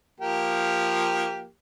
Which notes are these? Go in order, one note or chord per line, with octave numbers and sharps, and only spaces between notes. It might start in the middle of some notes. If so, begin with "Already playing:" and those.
F3 A#3 G4